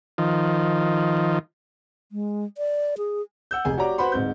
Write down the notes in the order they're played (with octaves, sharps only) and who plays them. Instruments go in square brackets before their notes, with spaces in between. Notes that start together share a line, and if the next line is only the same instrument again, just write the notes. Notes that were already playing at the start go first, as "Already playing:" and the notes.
[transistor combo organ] D#3 F3
[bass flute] G#3
D5
G#4
[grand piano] F#5 E6 G6
F1 G#4 G#5
F#4 G4 C#5 D5 A#5 D6
F#4 B4 C5 F#5 B5 C6
D1 G#2 C4 G6